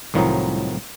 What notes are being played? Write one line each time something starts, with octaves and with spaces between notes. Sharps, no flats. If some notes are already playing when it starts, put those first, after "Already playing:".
C2 A2 D#3 F3 F#3 D#4